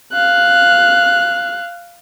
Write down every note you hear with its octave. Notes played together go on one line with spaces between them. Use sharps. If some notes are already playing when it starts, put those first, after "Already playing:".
F5 F#6